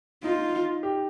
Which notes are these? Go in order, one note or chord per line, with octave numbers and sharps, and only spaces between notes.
D#4 F4
G4